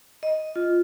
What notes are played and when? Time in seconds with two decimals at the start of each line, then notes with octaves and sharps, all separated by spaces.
0.23 D#5
0.56 F4